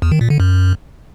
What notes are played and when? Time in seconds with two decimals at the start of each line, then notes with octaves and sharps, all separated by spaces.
0.02 E2
0.12 D#3
0.21 A#2
0.30 D3
0.40 F#2